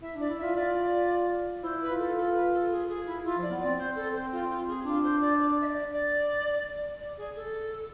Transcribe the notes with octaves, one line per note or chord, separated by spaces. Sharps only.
E4 E5
D4 D5
E4
F4 E5
F4 D5
E4 C5
B4
F4
A4
A4
B4
A4
G#4
G#4
E4
E4 F4
F3 D5
B3
C4 D5
C5
A4
C5
F4
F4
G#4
D4 F4
C5
D5
D5
E5
D5
D5
D5
G#4
A4